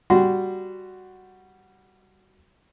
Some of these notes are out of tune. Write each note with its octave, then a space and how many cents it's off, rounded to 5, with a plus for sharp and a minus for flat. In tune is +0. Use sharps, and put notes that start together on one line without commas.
G3 +0 F#4 +0 C6 -20